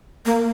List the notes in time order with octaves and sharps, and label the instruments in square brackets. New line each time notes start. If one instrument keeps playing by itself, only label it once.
[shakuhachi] A#3